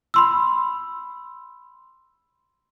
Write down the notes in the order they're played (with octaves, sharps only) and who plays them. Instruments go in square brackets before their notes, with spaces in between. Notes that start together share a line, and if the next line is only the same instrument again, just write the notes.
[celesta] B5 C6 E6